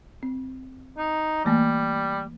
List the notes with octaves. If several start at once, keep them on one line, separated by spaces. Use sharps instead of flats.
C4
D#4
E3 G3 A3 A#3